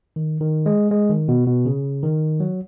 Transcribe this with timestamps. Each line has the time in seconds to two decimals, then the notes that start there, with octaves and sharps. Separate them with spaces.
0.16 D#3
0.41 D#3
0.66 G#3
0.91 G#3
1.09 D#3
1.28 B2
1.47 B2
1.65 C#3
2.03 D#3
2.40 F#3